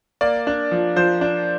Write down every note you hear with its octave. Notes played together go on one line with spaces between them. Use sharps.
A#3 D5
D4
F3
F3 C5
D4